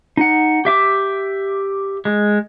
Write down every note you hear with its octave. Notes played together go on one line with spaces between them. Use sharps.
D#4 F#5
G4 E5 D6
G#3